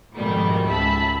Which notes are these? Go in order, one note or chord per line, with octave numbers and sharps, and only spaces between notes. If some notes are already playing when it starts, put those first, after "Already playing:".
F2 G#2 B2 D#3 G3 A3
C#2 E5 A5 B5